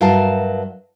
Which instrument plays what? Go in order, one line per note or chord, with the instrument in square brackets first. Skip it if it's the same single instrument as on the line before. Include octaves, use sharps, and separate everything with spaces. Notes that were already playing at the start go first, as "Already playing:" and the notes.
[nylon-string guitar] G2 F#3 A#4 E5 F5 A5